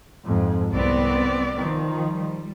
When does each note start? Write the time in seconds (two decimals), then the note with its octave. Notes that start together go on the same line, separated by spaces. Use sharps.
0.25 F2 G#2
0.73 C2 B3 C4 D5
1.56 D#3 F3
2.09 G3